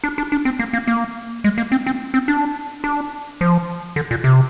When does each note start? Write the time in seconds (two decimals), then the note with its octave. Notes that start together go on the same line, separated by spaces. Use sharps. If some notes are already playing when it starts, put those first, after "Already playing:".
0.04 D4
0.18 D4
0.32 D4
0.45 C4
0.59 A#3
0.73 A#3
0.87 A#3
1.44 G#3
1.58 A#3
1.72 C4
1.86 C4
2.14 C4
2.28 D4
2.84 D4
3.41 F3
3.96 D3
4.11 A#2
4.24 C3